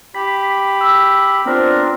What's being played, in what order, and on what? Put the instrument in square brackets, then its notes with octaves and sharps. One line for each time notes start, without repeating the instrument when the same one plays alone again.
[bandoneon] G4 B5 [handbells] B6
[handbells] E6
[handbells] B3 F4 C5 [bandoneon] C4 D4 A#4